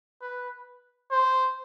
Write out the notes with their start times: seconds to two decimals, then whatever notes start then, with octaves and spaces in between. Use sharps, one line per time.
0.22 B4
1.11 C5